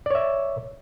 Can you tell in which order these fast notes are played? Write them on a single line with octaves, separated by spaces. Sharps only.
D5 C#5 E5